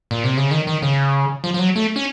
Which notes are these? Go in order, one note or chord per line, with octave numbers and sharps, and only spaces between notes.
A#2
C3
C#3
D#3
D#3
C#3
F3
F3
F#3
A3
C#4